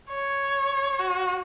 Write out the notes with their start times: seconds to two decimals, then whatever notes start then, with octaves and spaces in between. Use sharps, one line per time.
0.10 C#5
0.99 F#4